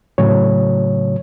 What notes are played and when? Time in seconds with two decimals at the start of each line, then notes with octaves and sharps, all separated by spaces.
0.18 A2 C#3 F#3 C#5